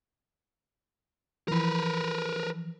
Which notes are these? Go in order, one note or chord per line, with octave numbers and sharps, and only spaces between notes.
E3 F3 A#4 B4